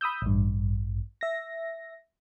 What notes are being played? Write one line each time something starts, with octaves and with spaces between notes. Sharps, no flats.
B5 D#6 E6 G6
A1 G2
E5 A#6